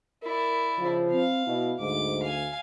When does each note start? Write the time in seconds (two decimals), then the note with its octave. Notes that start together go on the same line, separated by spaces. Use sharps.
0.23 E4 A#4 D5
0.79 C#3 F3
1.11 C4 F5
1.47 B2 E4
1.80 D2 G#2 D6
2.23 F5 G#5